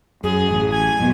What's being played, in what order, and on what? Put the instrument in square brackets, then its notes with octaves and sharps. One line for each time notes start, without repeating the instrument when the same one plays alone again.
[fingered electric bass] F#2 [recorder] G#4
[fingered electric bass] A1
[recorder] G#5
[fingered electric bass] F#2 B2 B3